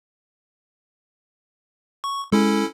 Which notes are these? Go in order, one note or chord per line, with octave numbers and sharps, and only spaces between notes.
C#6
G#3 C#4 E4 A4